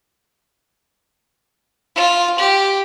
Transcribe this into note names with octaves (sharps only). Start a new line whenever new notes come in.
F4
G4